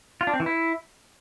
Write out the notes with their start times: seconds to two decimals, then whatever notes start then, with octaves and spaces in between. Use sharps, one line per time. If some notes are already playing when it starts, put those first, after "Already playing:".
0.21 F4
0.27 D4
0.34 C4
0.40 E3
0.46 E4